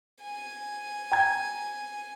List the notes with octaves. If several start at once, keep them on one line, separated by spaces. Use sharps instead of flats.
G#5
G5 A#5 G#6